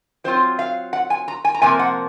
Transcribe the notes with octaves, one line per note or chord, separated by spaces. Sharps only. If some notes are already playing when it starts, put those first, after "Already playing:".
F#3 C4 F4 C5
F5
F#5
G#5
A#5
G#5
A#5
C3 F3 A#3 G#5
F#5